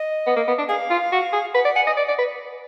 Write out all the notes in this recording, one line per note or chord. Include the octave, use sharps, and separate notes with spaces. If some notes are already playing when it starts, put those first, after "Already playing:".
Already playing: D#5
B3
A#3
B3
D4
G#4 F5
F4
F#4
G#4
B4 F#5
D5
F#5 G#5
D#5
D5
D5
B4